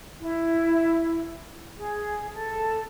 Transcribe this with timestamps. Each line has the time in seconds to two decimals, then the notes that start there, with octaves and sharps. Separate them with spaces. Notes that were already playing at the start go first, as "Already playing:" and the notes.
0.21 E4
1.77 G#4
2.34 A4